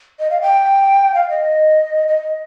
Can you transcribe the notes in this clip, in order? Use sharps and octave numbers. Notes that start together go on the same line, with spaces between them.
D#5
F5
G5
F5
D#5
D#5